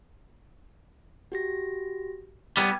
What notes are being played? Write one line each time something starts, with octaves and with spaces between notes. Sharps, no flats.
F#4 G4 A#6
G3 B3 G5 D6 G#6